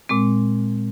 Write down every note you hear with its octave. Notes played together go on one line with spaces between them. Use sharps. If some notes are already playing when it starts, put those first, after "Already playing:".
A#2 G#3 C4